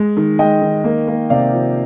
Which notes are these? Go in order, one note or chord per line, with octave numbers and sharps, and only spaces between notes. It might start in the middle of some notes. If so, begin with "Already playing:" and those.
Already playing: G#3
D#3
G#3 D#5 G5
D#3
A#3
A#3
C3 D5 F5
F3